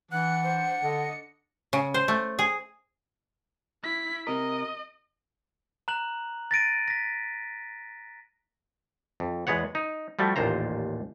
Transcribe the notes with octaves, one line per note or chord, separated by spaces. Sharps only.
E3 D4 F#5 F#6 C#7
C5
D3 D#5
C#3
C5
A3
G#4
E4 B6
C3 A#4 D#5
A#5 F#6 F#7
A6 A#6 D7 D#7
A#6 B6
F2
E2 G#3 B3 C#5 F#5
D#4
F3 G3 A3 F#4
A1 D#2 A#2 C5 A#5